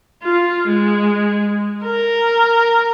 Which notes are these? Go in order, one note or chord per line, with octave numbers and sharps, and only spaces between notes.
F4
G#3
A#4